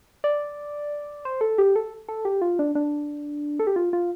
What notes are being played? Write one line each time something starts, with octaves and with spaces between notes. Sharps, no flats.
D5
C5
A4
G4
A4
A4
G4
F4
D4
D4
A4
G4
F4
F4